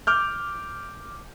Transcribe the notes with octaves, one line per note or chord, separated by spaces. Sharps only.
D6 F6 G6